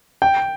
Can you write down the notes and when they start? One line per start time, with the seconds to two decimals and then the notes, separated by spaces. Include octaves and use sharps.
0.22 G5